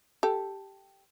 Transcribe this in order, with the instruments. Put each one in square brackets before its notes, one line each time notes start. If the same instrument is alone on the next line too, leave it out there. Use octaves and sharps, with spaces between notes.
[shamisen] G4 A4